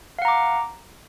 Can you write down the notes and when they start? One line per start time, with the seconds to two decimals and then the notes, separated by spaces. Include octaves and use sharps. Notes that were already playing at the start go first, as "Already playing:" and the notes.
0.19 F5
0.22 F#5
0.25 A#5
0.28 D6